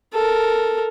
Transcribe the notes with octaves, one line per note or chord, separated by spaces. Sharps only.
A4 A#4